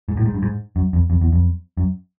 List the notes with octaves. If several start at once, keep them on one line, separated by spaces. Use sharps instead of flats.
G#2
A2
G#2
G2
G#2
F#2
F2
F2
E2
F2
F#2